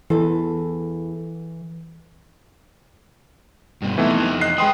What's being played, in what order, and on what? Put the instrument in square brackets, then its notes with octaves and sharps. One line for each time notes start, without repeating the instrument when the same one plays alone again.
[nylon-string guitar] E2 A4 [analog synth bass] E3 [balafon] E4
[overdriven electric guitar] G2 B2
[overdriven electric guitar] F2 D#4 [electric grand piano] E3 A3 B3
[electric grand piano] D#5 F#6 C7
[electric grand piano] G#3 C6 D#6 [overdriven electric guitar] B4 G5